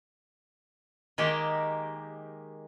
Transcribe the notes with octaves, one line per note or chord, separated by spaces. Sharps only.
D#3 G#3 A#3 G4